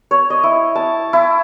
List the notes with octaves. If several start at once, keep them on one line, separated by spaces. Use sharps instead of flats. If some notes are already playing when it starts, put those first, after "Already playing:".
C#5
D#5
E4
A5
E4